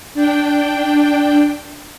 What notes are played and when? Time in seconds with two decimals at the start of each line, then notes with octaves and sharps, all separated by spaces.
0.14 D4 G5